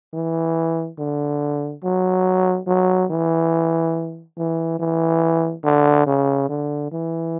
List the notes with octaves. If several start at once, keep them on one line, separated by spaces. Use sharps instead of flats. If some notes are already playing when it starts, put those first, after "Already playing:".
E3
D3
F#3
F#3
E3
E3
E3
D3
C#3
D3
E3